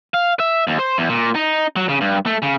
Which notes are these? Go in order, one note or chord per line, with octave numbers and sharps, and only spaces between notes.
F5
E5
D#2
C5
E2
A#2
D#4
F#3
C#3
G2
A3
C#3